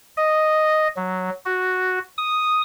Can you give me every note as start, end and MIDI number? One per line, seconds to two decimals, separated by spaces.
0.17 0.88 75
0.97 1.30 54
1.45 1.99 66
2.18 2.62 87